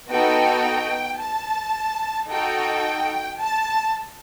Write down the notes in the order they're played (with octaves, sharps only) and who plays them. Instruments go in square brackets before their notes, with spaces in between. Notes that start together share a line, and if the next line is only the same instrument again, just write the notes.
[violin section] B3 D#4 F#4 A4 G5
A5
D#4 F#4 A4 G5
A5